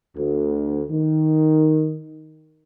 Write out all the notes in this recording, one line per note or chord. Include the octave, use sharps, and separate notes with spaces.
D2
D#3